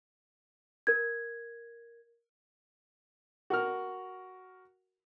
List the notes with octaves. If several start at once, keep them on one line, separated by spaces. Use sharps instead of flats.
A#4 G#6
F#4 A#4 F6